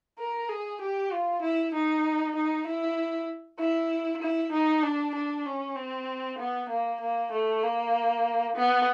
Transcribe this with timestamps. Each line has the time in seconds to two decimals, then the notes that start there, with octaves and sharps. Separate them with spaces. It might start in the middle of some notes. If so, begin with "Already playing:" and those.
0.18 A#4
0.49 G#4
0.81 G4
1.12 F4
1.42 E4
1.74 D#4
2.36 D#4
2.67 E4
3.59 E4
4.22 E4
4.52 D#4
4.83 D4
5.15 D4
5.45 C#4
5.76 C4
6.38 B3
6.69 A#3
7.00 A#3
7.32 A3
7.63 A#3
8.56 B3